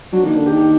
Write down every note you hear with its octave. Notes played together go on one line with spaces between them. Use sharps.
F#3 D4
D#3 A#3
D3 D4
G4
D#3
G4